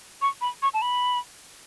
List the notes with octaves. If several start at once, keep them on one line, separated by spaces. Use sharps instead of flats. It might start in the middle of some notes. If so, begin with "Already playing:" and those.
C#6
B5
C#6
A5
B5